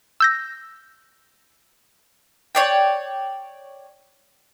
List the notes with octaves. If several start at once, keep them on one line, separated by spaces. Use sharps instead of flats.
E6 G6 A#6
C#5 D5 G5